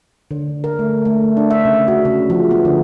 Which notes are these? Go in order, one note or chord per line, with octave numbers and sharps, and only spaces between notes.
D3
A#4
A3
A3
D4
E5
C#3
F#4
C#3
F3
B3
D3